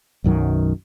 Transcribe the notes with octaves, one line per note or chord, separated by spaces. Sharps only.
B1 F#2 D#3 F#3